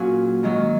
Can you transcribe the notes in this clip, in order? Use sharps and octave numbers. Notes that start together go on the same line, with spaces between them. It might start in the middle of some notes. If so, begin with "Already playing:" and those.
Already playing: A#2 F#3 C#4 F#4 G#4
G#2 D#3 F#3